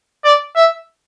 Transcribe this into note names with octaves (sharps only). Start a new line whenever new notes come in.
D5
E5